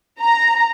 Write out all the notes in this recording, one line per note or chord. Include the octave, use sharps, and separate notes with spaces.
A#5